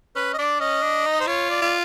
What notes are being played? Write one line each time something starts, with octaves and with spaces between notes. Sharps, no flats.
C#4 B4
D#5
D4 D5
C#4 D#5
D4
D#4
C5
F4 C#5
D5
F4